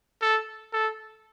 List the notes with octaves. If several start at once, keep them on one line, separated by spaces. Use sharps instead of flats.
A4
A4